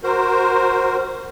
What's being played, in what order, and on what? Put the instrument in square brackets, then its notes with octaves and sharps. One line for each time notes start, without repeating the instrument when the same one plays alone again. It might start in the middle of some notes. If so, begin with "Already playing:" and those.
[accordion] F#4 A#4 C5